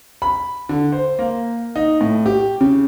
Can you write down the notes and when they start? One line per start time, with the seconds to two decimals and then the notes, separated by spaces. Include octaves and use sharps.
0.22 B5
0.69 D3
0.92 C5
1.19 A#3
1.76 D#4
2.01 A2
2.26 G4
2.61 C#3